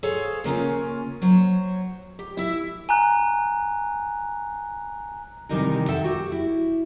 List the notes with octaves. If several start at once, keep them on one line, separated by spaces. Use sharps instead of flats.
G#4 A4 C5 C#5 F5
C#3 A#3 C#4 F4
F#3 C5 C#5
G4
E4 E5
G#5 A#5 F#6
C3 D#3 E3 G3 D#4 A#4
A4 C5 E5 F#5 G5
F#4 G4
E4